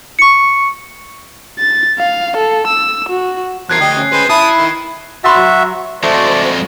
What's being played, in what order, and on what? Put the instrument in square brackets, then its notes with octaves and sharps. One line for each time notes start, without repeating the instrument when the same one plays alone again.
[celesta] C#6 C#7
[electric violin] A6
F5
A4
E6
F#4
[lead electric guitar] E2 A#4 [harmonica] F3 [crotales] F#6 G#6 C7
[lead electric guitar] D2 [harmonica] G4 D#5 [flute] G5
[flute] C#4
[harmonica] G#3 C5 [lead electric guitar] B4
[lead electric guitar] E4 [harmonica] A5 D#6 [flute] B5
[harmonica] D#3
[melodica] F#4 E5 [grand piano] B5 C6 A6
[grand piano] F#3
[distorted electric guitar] F2 G#3 [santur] A3 [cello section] F#4 C5 [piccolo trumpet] D5